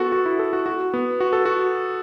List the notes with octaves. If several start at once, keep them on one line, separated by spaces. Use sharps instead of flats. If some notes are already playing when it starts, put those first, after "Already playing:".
Already playing: B3 F#4 A4
F#4
E4
A4
F#4
F#4
B3
F#4
A4
F#4